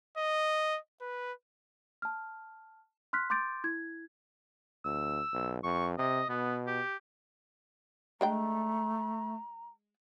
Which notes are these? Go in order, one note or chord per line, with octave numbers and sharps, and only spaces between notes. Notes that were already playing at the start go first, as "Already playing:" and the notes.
D#5
B4
A5 F6
C6 F6 F#6 B6
C6 D6 G6 A6 D7
E4 G#6
D2 E6
B1
F2 C#6
C3 D#5
B2 B3
G4
G#3 A3 D4 G5 A#5